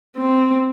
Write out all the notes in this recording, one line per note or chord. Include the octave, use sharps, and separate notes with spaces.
C4